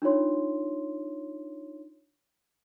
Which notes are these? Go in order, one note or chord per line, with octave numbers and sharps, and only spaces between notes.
D4 D#4 F4 C#5 C6